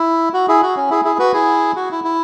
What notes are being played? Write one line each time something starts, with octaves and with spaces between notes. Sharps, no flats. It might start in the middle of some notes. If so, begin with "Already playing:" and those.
Already playing: E4
F#4
E4 G#4
F#4
C#4
E4 G#4
E4 G#4
F#4 B4
E4 G#4
F#4
E4
E4